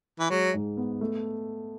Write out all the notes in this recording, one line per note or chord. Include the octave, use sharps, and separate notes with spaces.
E3
F#3 G#3
G#2
B3
A3